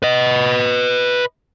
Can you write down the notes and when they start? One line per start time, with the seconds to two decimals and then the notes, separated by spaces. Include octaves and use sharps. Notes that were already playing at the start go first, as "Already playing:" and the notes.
0.03 B4 D#5